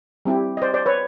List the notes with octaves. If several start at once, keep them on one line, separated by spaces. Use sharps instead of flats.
G3 C4 E4 G4
D#5
C5 D5
C5 D5
B4 C#5